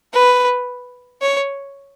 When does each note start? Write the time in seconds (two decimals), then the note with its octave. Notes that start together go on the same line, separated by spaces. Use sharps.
0.13 B4
1.22 C#5